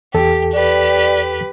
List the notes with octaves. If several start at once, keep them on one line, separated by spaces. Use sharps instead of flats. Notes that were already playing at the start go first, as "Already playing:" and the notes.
E2 G4 A4
G4 B4 D5